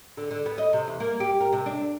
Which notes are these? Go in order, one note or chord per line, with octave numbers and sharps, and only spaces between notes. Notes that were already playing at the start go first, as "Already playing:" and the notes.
D3
D3
B3
D#5
C3
E2
A#3
G4
A#4
C3
D4